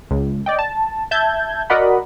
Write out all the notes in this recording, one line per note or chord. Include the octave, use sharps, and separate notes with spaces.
C#2
D5 D#5 G5
A5
E5 A5 G6 G#6
F#4 A#4 D5 D#5 F#5 B5